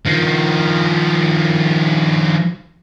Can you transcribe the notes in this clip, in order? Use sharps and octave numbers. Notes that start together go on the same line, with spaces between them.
D#3 F3